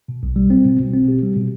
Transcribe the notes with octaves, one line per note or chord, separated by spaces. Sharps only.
B2
B1
G3
C4
B2
B2
C4
G4
G3
B2